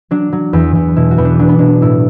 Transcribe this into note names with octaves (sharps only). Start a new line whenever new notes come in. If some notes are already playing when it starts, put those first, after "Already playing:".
F#3 D4
F#3
E2
E2
B2 E4
F#4
E2 B3
D4
F#3 D4
B3
B2 D4
A2 E4